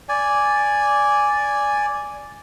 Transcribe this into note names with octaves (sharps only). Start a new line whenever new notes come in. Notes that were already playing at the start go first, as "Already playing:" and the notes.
D5 G#5